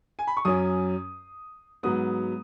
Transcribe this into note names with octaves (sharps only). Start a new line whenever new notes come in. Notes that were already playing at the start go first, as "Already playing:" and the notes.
G#5
B5
C#6
F#2 F#3 C#4 D#6
G#2 F#3 B3 D#6